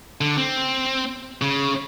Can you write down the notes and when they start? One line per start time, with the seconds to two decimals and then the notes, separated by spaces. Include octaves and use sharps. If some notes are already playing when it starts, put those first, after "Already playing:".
0.21 D3
0.37 C4
1.42 C#3